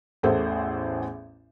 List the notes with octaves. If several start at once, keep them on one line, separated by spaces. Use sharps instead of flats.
A1 E2 A2 G#4 A4 C5